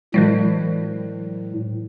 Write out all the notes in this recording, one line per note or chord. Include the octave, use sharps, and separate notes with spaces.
A2 E3 F#3 G#3